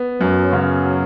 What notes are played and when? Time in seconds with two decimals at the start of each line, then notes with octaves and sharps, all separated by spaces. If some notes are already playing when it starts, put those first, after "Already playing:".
Already playing: B3
0.21 F#2 F#3
0.53 C#3